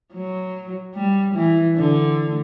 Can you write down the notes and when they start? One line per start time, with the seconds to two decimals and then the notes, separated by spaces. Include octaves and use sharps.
0.14 F#3
0.95 G3
1.35 E3
1.76 D3